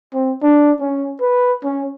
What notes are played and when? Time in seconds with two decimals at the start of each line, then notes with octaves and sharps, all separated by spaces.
0.14 C4
0.43 D4
0.80 C#4
1.21 B4
1.64 C#4